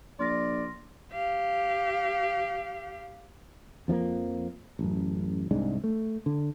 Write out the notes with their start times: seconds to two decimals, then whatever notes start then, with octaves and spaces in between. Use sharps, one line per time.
0.19 A#1 D5 C6 F6 A#6
1.12 G4 F5
3.88 F2 F3 G3 A#3
4.79 A1 F#2
5.51 C2 G#2 G#3 D4
5.84 A3
6.26 D3